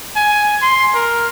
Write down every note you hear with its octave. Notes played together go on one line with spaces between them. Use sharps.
G#5
C6
A#4